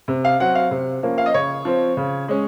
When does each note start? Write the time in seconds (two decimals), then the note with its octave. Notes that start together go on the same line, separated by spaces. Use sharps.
0.08 C3
0.25 F5
0.40 F#3 C4 F#5
0.55 F5
0.71 C3
1.03 F3 A#3 C#4
1.18 F5
1.26 D#5
1.34 C#3 C#5
1.65 F3 C4
1.97 C#3
2.28 G#3 C#4